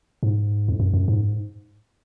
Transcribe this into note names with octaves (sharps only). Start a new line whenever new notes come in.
G#2
F2
F#2
F#2
G#2